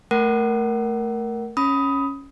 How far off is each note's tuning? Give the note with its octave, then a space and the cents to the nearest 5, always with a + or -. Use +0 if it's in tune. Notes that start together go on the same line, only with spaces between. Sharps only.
A3 +0 A#4 +10 F#5 +25
C#4 +0 B5 +5 D#6 +15